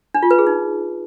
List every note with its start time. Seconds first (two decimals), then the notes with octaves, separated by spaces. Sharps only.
0.14 D4
0.23 F4
0.31 B4
0.39 G#4
0.47 D#4